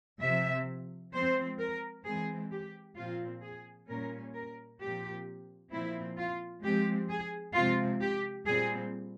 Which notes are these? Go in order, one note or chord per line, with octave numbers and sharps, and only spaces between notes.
C3 F3 C4 E5
F3 G#3 C4 C5
A#4
E3 G#3 C4 G#4
G4
A#2 F3 C4 F4
G#4
A#2 G3 C#4 A#4
A#4
A#2 F3 C4 G4
A#2 F3 C4 E4
F4
F3 G#3 C4 G4
G#4
C3 F3 G#3 C4 F4
G4
A#2 G3 C4 G#4